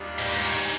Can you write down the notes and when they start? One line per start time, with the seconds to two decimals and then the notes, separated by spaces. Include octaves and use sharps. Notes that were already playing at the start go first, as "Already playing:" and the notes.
Already playing: D#2 D#3 G3 D4 F4
0.18 G#2
0.22 G2
0.32 G#2
0.42 A#2
0.52 G#2